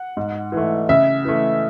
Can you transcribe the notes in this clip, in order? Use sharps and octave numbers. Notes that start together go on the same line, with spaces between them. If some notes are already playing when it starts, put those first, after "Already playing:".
Already playing: F#5
G#2
E3
A3
C#3 E5
E3 A3